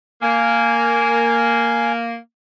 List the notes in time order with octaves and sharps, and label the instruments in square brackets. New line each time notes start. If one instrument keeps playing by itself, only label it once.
[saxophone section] A#3 [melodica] G#5